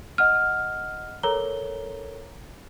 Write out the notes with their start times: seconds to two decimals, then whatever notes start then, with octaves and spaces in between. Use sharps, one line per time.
0.18 D#5 F#5 F6
1.23 A4 A#4 C#5 A#5 G7